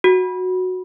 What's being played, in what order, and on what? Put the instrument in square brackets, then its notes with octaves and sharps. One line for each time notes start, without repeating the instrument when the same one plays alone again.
[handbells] F#4